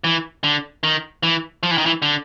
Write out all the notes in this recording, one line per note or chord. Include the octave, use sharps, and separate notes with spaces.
E3
D3
D#3
E3
F3
E3
D#3
E3
D3